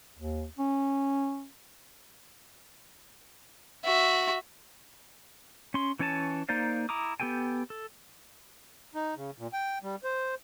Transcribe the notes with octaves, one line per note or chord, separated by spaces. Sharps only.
D#2
C#4
F#4 E5
C#4 C6
E3 C#4 C#5 G#5 A5
A#3 D#4 C5 D5 F5
E4 A#5 D6 D#6
B3 G4 A4 G5 G#5
A4
D#4
C#3
A#2
G5
G3
C5